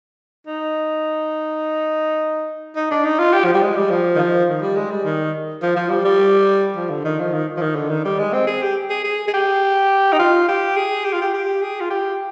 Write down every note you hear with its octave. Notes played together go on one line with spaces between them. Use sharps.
D#4
D#4
D4
D#4
F4
G4
F3
G3
G#3
G3
F3
D#3
F3
D#3
G3
G#3
G3
D#3
F3
F3
G3
G3
F3
D3
D#3
F3
D#3
F3
D#3
D3
D#3
G3
G#3
C4
G#4
G4
G#4
G#4
G#4
G4
D#4
F4
G4
G#4
G4
F4
G4
G4
G#4
F4
G4